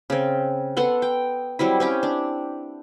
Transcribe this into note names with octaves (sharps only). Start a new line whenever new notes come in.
C#3 C4
B3 A4 F#5 C6
G5
F#3 G3 C4 E4
C4 C#4 G4
D4